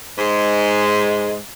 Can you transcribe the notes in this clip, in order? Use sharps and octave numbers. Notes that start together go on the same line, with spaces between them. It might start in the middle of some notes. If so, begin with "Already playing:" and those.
G#2 G#3